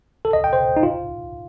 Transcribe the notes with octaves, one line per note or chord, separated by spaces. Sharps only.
A4
D#5
G5
C5
D#4
F4